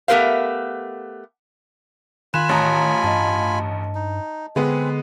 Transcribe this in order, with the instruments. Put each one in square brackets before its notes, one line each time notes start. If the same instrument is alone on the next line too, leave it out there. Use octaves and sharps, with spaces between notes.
[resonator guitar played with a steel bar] A3 B3 G4 A#4 C5 F5
[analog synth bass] D#3 [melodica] F4 G#5 B5 [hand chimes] F#6 [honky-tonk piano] E7
[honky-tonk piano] A1 A#5 [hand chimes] C#5 A5 D#6
[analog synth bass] G2 [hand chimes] D#5 A5
[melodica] D#4
[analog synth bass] D3 [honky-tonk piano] G#3 B3 [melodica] C4 G#4 B4